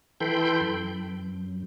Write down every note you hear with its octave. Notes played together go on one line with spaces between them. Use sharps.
E3 A4 G5 B5 C6 G6
F#2